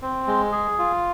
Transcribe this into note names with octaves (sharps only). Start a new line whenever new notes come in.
C4
G#3
G#4
F4